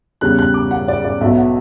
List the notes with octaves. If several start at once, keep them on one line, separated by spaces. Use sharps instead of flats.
E2 C#3 G3 F#6
F#6
D6
F#5
D5
D5
B1 B2 F#3 B3 E5
F#5